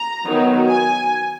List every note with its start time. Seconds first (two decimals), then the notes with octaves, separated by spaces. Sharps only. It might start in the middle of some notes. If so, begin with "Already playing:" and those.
Already playing: A#5
0.27 D#3 F#3 B3 D#4
0.70 G#5